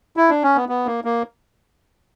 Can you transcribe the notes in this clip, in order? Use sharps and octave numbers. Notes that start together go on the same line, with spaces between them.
E4
D4
C#4
B3
B3
A#3
A#3